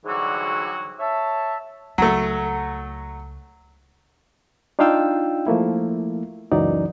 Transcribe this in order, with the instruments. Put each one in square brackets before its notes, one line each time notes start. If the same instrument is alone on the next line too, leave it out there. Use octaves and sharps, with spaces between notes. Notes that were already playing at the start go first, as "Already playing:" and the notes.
[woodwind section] G#2 D3 E3 F#3 G3 F#4
C#5 E5 A5
[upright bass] C#2 D#4 [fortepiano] F#3 A3
[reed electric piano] D4 D#4 F4 F5 G5 E6
F3 A3 A#3 E4
C#2 F#2 E3 F#3 D#4 D5